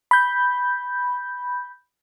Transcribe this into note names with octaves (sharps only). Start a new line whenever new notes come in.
B5 G6